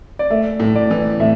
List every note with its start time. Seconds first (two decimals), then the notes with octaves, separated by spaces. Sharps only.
0.19 D5
0.31 A3 E5
0.60 A2
0.76 D5
0.90 E3
1.20 A2 E5